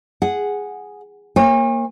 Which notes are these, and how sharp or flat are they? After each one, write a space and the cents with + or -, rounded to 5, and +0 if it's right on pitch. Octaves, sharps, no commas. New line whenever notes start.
G#4 -5 F#5 +0
A#3 +0 C#5 -35 G#5 -45